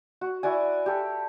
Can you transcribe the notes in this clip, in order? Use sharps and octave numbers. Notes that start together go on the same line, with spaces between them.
F#4
E4 F#4 D5 G#5
G4 A4